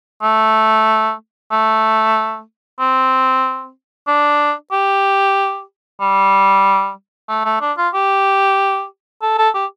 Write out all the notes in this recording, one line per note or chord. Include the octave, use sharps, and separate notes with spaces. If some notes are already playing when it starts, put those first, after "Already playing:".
A3
A3
C4
D4
G4
G3
A3
A3
D4
F4
G4
A4
A4
G4